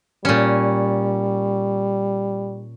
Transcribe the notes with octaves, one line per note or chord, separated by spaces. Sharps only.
A#2 G3 C#4